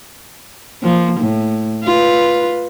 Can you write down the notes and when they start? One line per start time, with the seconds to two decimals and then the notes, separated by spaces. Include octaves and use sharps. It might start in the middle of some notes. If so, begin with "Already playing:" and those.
0.82 F3 A#3
1.20 A2
1.84 F4 B4